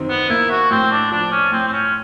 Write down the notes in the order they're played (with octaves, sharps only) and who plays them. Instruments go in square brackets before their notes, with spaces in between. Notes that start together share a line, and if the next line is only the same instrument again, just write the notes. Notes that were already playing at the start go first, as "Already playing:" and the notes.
Already playing: [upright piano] F#2 D#3 C4
[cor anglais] B3
[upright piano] A#3 [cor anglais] E4
[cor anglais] F#4
[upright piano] A2 [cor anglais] C4
[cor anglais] D4
[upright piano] F3 [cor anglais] D4
[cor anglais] C#4
[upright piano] A2 [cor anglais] C4
[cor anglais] C4
C#4